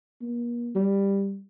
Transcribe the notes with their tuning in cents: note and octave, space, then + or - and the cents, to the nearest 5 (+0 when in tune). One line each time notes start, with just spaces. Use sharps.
A#3 +40
G3 +10